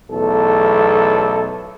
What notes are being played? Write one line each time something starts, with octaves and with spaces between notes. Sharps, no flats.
B1 E2 A3 A4